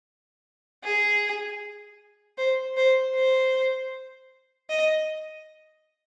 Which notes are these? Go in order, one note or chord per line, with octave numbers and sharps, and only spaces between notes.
G#4
C5
C5
C5
D#5